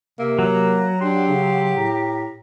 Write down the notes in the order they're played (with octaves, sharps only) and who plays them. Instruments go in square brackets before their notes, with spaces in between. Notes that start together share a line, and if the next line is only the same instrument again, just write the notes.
[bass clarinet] C3 [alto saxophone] A#3 [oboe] E5
[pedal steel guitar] F#3 [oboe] A#5
[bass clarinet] D4 [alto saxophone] G4 [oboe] C6
[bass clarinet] C#3
[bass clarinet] A2 [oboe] A#5